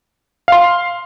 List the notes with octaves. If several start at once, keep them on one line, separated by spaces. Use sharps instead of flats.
F5 C6